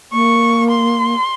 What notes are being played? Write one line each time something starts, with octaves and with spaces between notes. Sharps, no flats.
A#3 C#6
C6